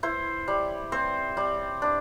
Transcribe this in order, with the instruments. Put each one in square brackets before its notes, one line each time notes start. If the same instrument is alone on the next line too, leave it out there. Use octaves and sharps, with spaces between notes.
[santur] E4 C5
G3
C4 C5
G3
D4